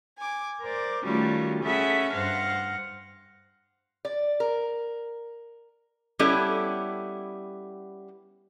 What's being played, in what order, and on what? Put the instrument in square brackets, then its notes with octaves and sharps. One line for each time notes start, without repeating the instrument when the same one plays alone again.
[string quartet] G#5 D6
A#4 C5 D5
D#3 G3 A3 C#4 F4 F#4
C#4 G#4 A4 E5 F#5 B5
G2 C5 F5 F#5 A#6
[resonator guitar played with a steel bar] D5
A#4
G3 B3 C#4 E4 G4 A4